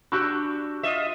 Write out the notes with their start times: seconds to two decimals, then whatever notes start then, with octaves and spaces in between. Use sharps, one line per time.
0.12 D4 F#4 G4 C#6 E6 G6
0.83 F4 D#5 E5